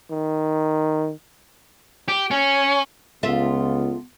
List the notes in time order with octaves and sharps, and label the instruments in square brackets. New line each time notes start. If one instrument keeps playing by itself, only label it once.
[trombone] D#3
[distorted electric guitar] G4
C#4
[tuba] C#2 [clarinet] B3 [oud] F4 A4 E5